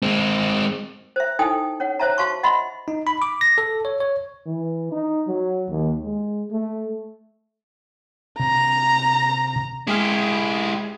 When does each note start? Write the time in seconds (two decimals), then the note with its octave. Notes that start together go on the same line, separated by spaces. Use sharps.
0.03 G#3 C4
1.16 C5 E5
1.39 D#4 E4 A4 G5 G#5 D#6
1.80 C#4 C#5 F#5
2.00 C5 C#5 E5 A5 A#5
2.18 F#4 F5 A5 C6 C#6
2.43 D#5 E5 F#5 B5 C6
2.88 D#4
3.07 B5
3.22 D6
3.41 A#6
3.58 A4
3.85 C#5
4.00 C#5
4.46 E3
4.92 D#4
5.28 F#3
5.70 D#2
6.03 G#3
6.51 A3
8.40 C3 A#5
9.87 G#3 E4 G4 G#4 F6